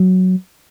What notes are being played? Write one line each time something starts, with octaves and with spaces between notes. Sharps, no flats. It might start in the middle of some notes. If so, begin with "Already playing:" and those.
Already playing: F#3